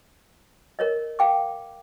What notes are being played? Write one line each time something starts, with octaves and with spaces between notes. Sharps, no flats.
A#4 C#5 D#5
F5 G5 D6